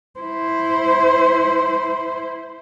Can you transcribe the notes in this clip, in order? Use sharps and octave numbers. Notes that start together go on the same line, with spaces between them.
E4 C5